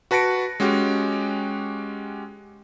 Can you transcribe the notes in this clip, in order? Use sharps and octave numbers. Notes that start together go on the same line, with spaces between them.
F#4 B4 A5 A#6 C#7 D7
G#3 C#4 F#4 G4